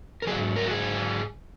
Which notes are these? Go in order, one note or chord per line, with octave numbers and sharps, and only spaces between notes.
A#4
G#2 F#3 G#4
A#4
F#4
G#4